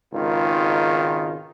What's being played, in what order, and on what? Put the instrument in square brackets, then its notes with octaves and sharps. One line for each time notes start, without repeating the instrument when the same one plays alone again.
[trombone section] G#1 C#2 D#3 F4